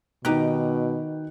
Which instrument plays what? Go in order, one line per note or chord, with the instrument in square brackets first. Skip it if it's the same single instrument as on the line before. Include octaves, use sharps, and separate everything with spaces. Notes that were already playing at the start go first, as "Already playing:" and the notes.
[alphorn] B2 [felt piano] D#3 G5 F#6 [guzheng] D#4 G4